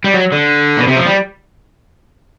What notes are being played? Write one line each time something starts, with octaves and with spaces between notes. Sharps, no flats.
G3
F#3
D3
B2
C3
F3
G3